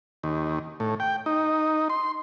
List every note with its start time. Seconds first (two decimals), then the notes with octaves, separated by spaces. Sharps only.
0.24 D#2
0.80 A2
1.00 G5
1.26 D#4
1.90 C6